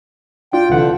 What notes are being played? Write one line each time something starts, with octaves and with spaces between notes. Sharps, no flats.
D4 F4 G5
C2 D3 E3 F#5